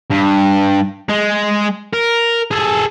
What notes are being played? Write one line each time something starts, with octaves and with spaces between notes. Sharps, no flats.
G2
G#3
A#4
G#4 A4